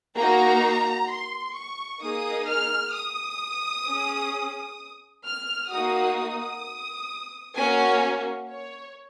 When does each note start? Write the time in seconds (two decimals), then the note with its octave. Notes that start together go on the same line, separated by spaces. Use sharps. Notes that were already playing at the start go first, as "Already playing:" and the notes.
0.17 A#3 D#4 F#4 A#5
1.10 C6
1.55 C#6
2.02 A#3 D#4 G#4 D#6
2.48 F6
2.94 D#6
3.87 C#4 G#4
5.26 F6
5.72 A#3 D#4 F#4 D#6
6.18 D#6
7.56 A#3 C#4 F#4 G#5
8.49 C#5